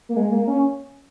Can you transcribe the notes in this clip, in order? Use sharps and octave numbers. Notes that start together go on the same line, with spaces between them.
A#3
G#3
A#3
C#4